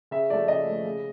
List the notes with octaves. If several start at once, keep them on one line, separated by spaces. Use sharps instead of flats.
C#3 E5
F3 A3 D5
C#3 D#5
F3 A3
C#3